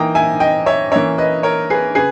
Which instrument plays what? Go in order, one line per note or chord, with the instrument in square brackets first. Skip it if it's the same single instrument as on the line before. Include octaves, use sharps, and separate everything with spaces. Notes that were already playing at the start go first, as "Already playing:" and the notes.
Already playing: [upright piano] E3 A#3 D#4 G5 A#5
E5 G#5
D#5 G5
C#5 E5
E3 A#3 C#4 C#5 E5
B4 D#5
A#4 C#5
G#4 B4
C#3 G#4 B4